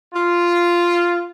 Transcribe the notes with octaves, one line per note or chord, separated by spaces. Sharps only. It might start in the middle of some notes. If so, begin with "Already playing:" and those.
F4